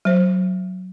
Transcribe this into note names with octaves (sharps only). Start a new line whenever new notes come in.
F#3 C5